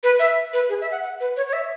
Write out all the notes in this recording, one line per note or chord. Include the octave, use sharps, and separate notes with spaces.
B4
E5
B4
G#4
E5
F#5
F#5
B4
C#5
C#5
E5